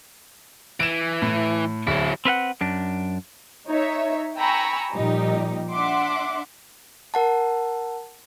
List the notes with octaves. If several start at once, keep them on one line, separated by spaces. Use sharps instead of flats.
E3 D7 E7
A2
D1 F#3 E4
C4 B4 F5 F#5
F#2 D4
D#4 C#5 E5
G5 G#5 A#5 B5 C#6 E6
A#2 F3 G3 D#4 G4
D4 E5 F#5 C6 D6
A#4 F#5 A5